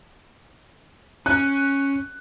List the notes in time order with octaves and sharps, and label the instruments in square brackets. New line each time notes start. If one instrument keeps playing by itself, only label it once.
[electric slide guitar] C#4 [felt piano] F#6